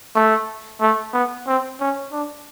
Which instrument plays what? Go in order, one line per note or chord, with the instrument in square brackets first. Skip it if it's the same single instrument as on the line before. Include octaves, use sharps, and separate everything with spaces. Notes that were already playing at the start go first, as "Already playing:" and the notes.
[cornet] A3
A3
B3
C4
C#4
D4